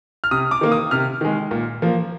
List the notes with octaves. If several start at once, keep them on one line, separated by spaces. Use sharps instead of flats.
F6
C3 D#6
D6
D#3 A#3
D#6
C3 F6
D#3 G#3
A#2
F3 A#3